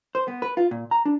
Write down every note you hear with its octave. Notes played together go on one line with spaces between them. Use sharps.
C5
B3
B4
F4
A#2
A#5
D4